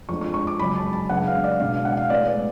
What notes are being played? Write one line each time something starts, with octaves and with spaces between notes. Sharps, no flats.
F2 F3 G#3 D4 C#6
C#6
C#6
D6
F#2 C#3 G#3 C#4 B5
A5
A5
F#2 C#3 G#3 B3 D4 F#5
F5
D5
B2 G#3 B3 D4 F5
F#5
F5
A2 G#3 B3 D5
D5